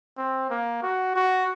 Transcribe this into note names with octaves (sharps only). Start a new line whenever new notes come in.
C4
A#3
F#4
F#4